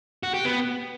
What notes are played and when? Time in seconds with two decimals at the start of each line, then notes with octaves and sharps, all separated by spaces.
0.23 F#4
0.34 G4
0.45 B3